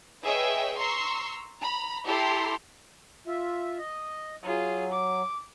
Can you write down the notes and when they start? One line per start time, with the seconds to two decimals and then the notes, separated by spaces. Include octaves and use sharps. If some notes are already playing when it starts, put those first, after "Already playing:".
0.24 G#4 B4 C#5 D#5 E5 G5
0.77 A#5 C6 C#6 E6
1.59 A#5 B5
2.07 E4 G4 A4 A#5 C6
3.27 F4 E5
3.78 D#5
4.43 F#3 F4 G#4
4.91 D6